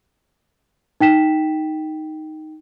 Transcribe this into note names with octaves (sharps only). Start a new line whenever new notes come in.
D#4 G5 B6 E7